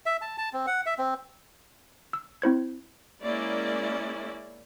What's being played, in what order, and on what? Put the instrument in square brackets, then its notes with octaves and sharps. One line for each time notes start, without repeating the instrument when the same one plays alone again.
[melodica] E5
A5
A5
C4
F#5
E5
C4
[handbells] E6
C4 E4 C5 G#6
[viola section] G#3 A#3 C#4 E4 D5